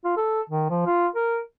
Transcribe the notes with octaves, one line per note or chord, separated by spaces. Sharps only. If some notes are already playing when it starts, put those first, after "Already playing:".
F4
A4
D#3
F3
F4
A#4